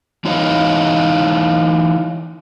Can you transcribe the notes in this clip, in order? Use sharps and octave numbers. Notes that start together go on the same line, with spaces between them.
E3 D#4 E4 C#5 D#5 F5